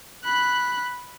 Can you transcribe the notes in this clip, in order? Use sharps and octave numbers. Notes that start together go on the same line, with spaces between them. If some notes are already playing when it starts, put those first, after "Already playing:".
B5 F#6